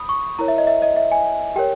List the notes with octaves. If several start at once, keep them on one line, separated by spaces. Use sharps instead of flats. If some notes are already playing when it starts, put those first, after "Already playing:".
Already playing: B5 D#6
C#6
E4 A#4 C#5 A#5
E5
D#5
E5
D#5
E5
G#5
G4 A#4 C#5 G5